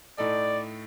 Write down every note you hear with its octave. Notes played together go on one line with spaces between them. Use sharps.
A2 D#4 A4 D5